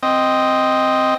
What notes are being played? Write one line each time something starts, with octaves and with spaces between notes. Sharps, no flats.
C4 D#5